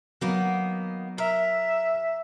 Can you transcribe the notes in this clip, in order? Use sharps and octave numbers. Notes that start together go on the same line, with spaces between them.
D#3 F#3 A#3 B3
A#4 E5